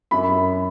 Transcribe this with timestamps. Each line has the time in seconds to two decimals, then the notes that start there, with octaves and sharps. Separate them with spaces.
0.11 F#2 B5
0.29 F#2